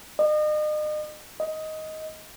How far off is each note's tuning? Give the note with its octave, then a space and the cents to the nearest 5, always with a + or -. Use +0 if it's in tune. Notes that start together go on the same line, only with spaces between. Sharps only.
D#5 -40
D#5 +10